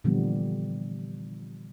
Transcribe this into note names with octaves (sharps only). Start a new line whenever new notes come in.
A#2 D3 E3 F3 G3 B3